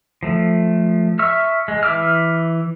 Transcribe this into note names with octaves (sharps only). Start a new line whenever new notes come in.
F3 A3
E5 C#6 E6 F6
G#3
E3 E5 D6 E6 F6